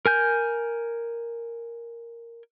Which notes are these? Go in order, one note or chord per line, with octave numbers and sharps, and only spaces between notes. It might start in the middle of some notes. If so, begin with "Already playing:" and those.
A#4 G#5 G6